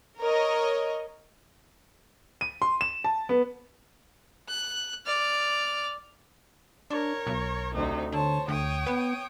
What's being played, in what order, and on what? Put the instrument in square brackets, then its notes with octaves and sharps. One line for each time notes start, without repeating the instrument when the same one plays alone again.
[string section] A#4 C#5 D#5
[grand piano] D#7
C6
E7
A5
B3
[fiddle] F#6
D5 F6
[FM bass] D4 [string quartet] A#4 C#5
[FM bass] B1
[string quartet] D2 C3 D#4
[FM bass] D3 [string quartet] C5 C#5 A5
[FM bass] D2 [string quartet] C#5 G5 D#6
[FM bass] B3